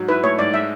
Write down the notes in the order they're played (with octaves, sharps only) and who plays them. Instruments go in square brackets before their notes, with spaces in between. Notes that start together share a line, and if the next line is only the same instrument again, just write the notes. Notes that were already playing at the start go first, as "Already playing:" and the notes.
Already playing: [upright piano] G#2 F#3
[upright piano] E4 [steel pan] B4
[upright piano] A3 [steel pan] C#5
[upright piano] G#2 [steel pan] D5
[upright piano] G#3 [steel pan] E5